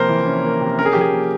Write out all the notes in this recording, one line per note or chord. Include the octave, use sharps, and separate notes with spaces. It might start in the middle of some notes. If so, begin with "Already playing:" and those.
Already playing: C3 F3 A#3 A#4 C5
E3
C#4
A#3
C3
C#4 A#4
G#4
G4
F3 G#4
A#3